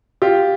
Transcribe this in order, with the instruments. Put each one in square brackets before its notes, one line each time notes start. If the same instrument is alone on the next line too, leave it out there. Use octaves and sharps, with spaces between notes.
[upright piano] F4 [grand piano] G4